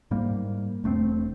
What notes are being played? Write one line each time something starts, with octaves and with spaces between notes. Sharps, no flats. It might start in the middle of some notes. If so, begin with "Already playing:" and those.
G#2 G3 A#3
E1 A3 A#3 C4